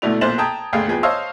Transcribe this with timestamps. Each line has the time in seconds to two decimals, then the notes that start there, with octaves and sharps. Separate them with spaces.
0.02 D2 B2 A3 E4 D5 F7
0.21 B1 A#2 C5 A6 E7 F#7
0.38 G5 A5 A#5 D#6 G6 G#6
0.73 G1 D2 G#4 F5 G5
0.88 E2 F3 G#4 B4 G5
1.03 C5 C#5 D#5 F5 A5 E6